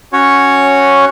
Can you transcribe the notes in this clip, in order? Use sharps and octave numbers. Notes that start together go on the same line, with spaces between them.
C#4 F#4 C#5